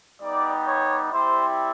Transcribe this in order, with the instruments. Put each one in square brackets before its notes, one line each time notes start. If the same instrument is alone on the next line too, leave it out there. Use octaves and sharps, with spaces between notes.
[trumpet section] G3 B3 D#4 G4 D5
C#5
G3 C4 E4 G4 C5